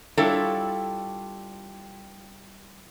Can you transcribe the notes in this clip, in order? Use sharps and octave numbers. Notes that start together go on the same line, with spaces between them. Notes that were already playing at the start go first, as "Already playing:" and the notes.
G3 D4 E4 F4 A4 C#5